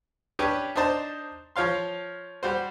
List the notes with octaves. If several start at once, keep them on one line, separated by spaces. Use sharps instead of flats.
C#4 D4 G4 B4 C#5
D4 D#4 C5 A5
F3 C#5 F5 C6
G3 F#4 C5